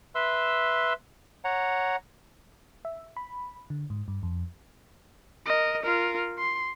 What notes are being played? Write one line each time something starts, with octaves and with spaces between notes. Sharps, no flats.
B4 E5 C6 E6
C#5 F#5 A#5
E5
B5
D3
G#2
G2
F2
A#4 D#5
F4 A#4
C6